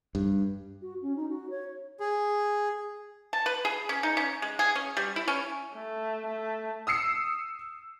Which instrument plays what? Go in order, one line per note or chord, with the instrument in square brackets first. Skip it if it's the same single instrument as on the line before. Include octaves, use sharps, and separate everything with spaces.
[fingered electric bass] G2
[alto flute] F#4
C#4
D#4
F#4
C#5
[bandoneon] G#4
[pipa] A5
B4
G#4
C#4
D#4
C#4
G#3
G#4
C#4
G3
E4
C#4
[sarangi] A3
A3
[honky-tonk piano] D#6 E6 C7 C#7